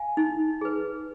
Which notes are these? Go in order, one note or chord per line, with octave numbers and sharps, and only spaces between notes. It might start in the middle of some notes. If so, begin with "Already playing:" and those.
Already playing: F5 G#5
D#4
G#4 B4